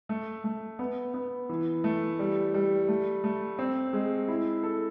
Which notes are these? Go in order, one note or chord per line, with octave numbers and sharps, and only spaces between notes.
A3
A3
B3
B3
E3
A3
G3
G3
A3
A3
C4
G#3
E4
A4